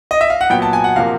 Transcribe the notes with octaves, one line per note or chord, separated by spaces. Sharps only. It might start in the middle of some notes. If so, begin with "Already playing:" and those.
D#5
E5
F5
F#5
A#2 F#3 B3 G5
A5
G#5
F#5
C3 F3 A#3 F5